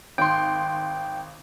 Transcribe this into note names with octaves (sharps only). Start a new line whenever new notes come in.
G#1 G5 C6